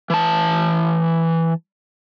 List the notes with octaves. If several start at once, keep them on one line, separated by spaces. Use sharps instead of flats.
E3 A5